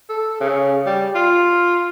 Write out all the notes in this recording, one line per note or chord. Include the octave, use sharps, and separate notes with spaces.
A4
C#3
G3
F4